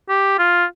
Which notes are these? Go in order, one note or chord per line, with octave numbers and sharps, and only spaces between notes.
G4
F4